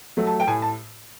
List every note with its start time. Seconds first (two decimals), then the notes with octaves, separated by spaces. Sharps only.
0.17 F#3 A3
0.27 A5
0.40 G5
0.47 A2 G#5
0.62 A5